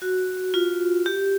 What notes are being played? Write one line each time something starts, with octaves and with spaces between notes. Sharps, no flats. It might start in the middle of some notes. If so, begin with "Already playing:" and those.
F#4
F4
G4